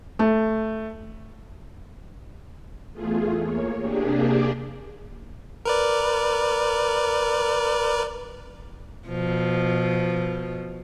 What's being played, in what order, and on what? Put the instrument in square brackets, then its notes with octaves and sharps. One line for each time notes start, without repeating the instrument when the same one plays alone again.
[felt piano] A3
[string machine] E2 A3 F4 G#4
A#3 C#5
C3 A#3 D4 G4 G#4
[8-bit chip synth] A#4 B4 D5
[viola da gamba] B2 F3